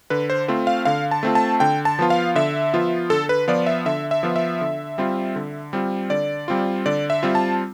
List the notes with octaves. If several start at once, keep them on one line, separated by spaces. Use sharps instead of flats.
D3 B4
C5
A3 C4 F4
F5
D3 F5
A5
A3 C4 F4
A5
D3 G5
A5
F3 B3 F4
F5
D3 E5
F3 B3 F4
D3 A4
B4
F3 B3 F4 D5
E5
D3 E5
E5
F3 B3 F4
E5
D3
G3 C4 F4
D3
G3 C4 F4
D3 D5
G3 C4 F4
D3 D5
E5
G3 C4 F4
A5